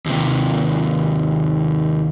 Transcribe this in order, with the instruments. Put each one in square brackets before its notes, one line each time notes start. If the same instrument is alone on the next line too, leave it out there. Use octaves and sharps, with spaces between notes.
[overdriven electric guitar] D#2 C3